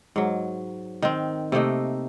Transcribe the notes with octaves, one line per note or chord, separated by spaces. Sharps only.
G#2 F#3
D#3 C4
C3 A3 A#3 D#4